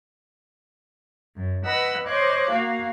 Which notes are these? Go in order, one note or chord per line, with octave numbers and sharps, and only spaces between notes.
F#2
B4 D#5 F#5 B5 E6
C5 C#5 D#5 D6 F#6 G#6
A#3 F#4 F5